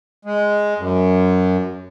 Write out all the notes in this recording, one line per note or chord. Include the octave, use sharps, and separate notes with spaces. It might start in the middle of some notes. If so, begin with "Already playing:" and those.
G#3
F#2